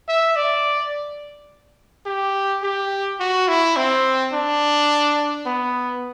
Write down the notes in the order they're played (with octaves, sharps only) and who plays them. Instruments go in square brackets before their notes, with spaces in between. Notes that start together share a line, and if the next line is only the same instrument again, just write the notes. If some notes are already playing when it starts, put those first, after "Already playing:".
[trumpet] E5
D5
G4
G4
F#4
E4
C4
D4
B3